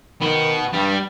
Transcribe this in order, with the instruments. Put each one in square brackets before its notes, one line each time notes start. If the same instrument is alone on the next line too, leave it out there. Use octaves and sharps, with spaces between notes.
[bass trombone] D#3 [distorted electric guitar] B3 F#4
[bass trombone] G2 [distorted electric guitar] G3